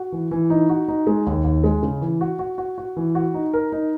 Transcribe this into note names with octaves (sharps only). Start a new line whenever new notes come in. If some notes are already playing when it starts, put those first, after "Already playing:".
Already playing: F#4
E3
E3
D#4
F#4
D#4
G#3
D#2
D#2
G#3
C#3
E3
F#4
F#4
F#4
F#4
E3
F#4
D#4
A#4
D#4